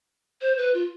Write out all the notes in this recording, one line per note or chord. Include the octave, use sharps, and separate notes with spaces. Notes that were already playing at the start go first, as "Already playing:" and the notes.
C5
B4
F4